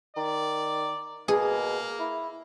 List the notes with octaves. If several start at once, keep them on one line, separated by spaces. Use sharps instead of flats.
D#3 D5
B2 A#3 G#4
E4